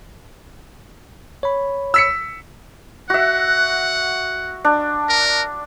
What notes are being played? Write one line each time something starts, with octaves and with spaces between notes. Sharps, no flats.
C#5 B5
E6 B6 C#7
F#4 E5 F#5
D4
A#4